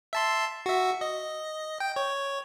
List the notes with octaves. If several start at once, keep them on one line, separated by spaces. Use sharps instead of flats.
E5 A5 C6
F#4 E5
D#5
G5
C#5